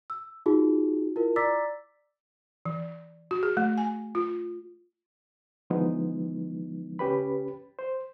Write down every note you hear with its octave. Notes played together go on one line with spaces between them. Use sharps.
E6
D#4 F4 F#4 G#4
E4 F4 A#4
D5 A#5 D6 E6 A6 B6
E3
F#4
G#4
A3
G#5
F4
D3 E3 F3 G#3 B3 D#4
C#2 C#4 G4 B4 B5
C5